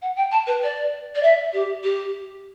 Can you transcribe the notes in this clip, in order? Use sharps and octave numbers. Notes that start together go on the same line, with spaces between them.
F#5
G5
A5
B4
D5
D5
E5
G4
G4